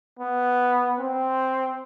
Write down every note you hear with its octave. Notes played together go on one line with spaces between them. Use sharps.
B3
C4